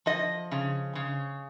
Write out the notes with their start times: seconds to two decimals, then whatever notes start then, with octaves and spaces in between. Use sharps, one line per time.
0.06 F3 D#5
0.51 C#3
0.95 C#3